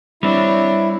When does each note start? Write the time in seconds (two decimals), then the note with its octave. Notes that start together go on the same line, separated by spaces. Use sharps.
0.23 G3 C4 D4 E4 C#5